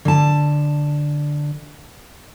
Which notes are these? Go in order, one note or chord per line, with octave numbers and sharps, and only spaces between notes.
D3 A5